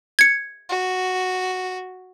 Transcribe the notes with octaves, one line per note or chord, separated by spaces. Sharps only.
G#6 C#7
F#4